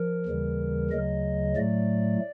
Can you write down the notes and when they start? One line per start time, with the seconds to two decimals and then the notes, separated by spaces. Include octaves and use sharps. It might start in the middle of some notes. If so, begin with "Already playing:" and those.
Already playing: F3 A#4
0.26 D#2 C#3 E3 G3
0.91 D2 C#3 F#3 D#5
1.56 A2 F#3 A3 D5